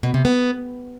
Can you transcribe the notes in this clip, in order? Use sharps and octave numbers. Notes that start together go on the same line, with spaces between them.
B2
C3
B3